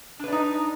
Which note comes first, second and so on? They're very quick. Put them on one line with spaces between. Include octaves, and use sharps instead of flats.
D4 B4 D5 D#4